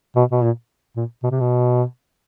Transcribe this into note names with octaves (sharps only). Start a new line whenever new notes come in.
B2
B2
A#2
A#2
B2
C3
B2